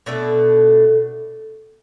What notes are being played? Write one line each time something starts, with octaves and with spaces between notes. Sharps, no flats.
B2 A3 D4 A4